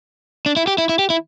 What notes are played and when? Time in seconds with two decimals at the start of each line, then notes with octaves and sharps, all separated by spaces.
0.46 D4
0.57 E4
0.67 G4
0.78 E4
0.89 E4
0.99 G4
1.10 E4